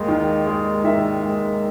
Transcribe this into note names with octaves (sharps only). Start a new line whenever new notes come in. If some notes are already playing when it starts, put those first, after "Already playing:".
Already playing: D#2 G#3
D#3
G#3
D#3 E5
G#3